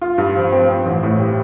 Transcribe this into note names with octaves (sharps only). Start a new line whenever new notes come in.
F4
G2
F3
C4
C4
A1
A2
G3